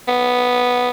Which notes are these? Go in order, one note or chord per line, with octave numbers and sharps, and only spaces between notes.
B3